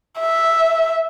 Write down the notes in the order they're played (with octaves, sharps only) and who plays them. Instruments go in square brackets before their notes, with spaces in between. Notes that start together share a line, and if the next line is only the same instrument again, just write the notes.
[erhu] E5